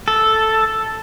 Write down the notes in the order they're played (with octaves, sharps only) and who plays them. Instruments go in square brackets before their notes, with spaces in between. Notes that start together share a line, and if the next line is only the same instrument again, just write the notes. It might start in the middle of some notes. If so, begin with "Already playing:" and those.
[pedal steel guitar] A4